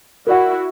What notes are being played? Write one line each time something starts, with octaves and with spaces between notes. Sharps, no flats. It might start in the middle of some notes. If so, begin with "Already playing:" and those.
E4 F#4 A#4 D5 F#5